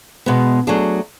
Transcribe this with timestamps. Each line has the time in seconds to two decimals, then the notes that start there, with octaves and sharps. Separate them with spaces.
0.26 B2 G#3 B3
0.67 F#3 A3 D4 G#4